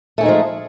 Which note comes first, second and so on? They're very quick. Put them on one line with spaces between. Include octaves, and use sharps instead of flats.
A3 G#4 D#4 G#3 F3